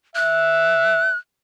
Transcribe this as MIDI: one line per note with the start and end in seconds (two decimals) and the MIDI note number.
0.16 1.11 76
0.16 1.17 90